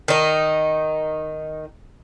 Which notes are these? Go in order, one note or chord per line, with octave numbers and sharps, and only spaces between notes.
D#3 D#4